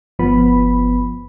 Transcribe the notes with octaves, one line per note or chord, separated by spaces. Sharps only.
G1 F3 B3 B5